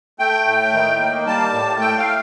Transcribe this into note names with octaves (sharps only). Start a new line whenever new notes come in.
A3 G5
A2
D#3
A#3
G3 A5
A2
A3 G5
F5